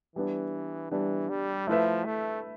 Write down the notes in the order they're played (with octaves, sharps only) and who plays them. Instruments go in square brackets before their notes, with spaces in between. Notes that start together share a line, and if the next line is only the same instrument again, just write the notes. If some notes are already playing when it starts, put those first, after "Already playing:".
[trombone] E3 [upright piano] G3 B3 D4
[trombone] E3 [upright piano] G3 B3 D4
[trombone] G3
[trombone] F3 [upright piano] A3 E4 B4 E5
[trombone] A3